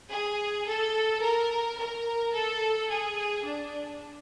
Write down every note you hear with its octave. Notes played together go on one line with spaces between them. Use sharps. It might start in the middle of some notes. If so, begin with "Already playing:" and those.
G#4
A4
A#4
A#4
A4
G#4
D4